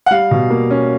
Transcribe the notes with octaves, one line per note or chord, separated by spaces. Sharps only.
F#5
G3 F5
B2
A#3
C#4